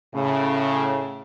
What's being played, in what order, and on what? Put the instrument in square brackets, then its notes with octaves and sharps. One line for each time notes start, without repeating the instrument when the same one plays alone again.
[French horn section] A2 C#3